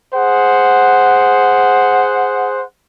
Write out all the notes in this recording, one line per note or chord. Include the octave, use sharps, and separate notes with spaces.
G#4 C5 F#5